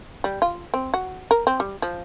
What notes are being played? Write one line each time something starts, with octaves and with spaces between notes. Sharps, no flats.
G3
F4
C4
F#4
A#4
C4
G3
F3